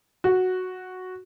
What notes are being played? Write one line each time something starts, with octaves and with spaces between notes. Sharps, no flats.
F#4